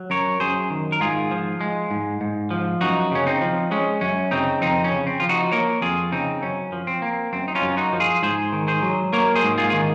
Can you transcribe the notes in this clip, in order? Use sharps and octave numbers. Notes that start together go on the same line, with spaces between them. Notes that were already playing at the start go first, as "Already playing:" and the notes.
Already playing: F#3
F#2 A#4 C#5
F#2 G#4 C5
D#3
A#4
G#2 F4 G#4
F3
G#3
G#2
G#2
F3
F#2 D#4 F#4
C#3 C#4
C4 D#4
F3
G#3 C#4
F#2 C#4
C#3 C4 D#4
F2 C4 D#4
C#4
C#3
C4
F3 F4
D#4 F#4
A#3 A#4 C#5
F2 F4 G#4
C#3 C4 D#4
F#2 C#4
F3
C4
A#3
F#2 C4
D#4
C#4 F4
F#2
D#4 F#4
F3
F4 G#4
G#2 G#4 C5
D#3
G#4 C5
F#3
A#3 A#4 C#5
G#4 C5
G#2
F4 G#4
D#3 G#4